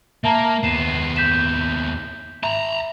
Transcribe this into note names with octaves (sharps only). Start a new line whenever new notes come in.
A#3 E5 A5 A#5
D#2 B3 C7 E7
G6 B6 E7
E5 A5 A#5